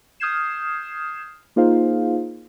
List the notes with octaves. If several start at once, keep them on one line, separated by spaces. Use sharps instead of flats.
D#6 F6 G6 G#6 C7 E7
A#3 D#4 F4 G#4 C5 F5